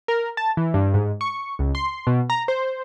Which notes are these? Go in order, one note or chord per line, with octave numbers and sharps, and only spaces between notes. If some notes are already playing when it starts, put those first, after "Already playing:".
A#4
A5
E3
G2
G#2
C#6
C#2
C6
B2
A#5
C5